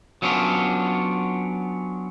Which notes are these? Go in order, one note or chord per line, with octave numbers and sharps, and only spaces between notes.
F#3 B3 C#4 D4 F4